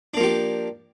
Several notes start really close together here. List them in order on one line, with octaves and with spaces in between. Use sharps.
D4 A#3 F3 G4